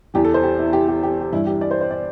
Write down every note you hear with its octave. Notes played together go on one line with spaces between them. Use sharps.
E2 E3 G4
A4
C5
G4
E4
G4
G4
G4
G4
G2 E3 E4
G4
D5
C5
C5
D5